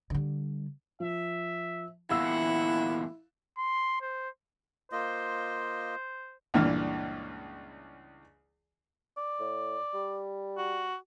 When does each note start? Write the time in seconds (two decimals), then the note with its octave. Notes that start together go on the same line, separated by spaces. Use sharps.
0.10 D3 G3
1.00 F3 E5
2.10 E2 A#2 E4 F5 F#5 E6
3.58 C6
4.02 C5
4.92 A#3 F4 C5 D#5
6.54 C#2 G2 A#2 E3 F6
9.18 D5
9.40 A2
9.94 G3
10.58 F#4